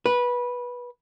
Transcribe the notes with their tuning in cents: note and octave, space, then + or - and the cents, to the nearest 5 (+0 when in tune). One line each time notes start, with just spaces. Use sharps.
B4 -15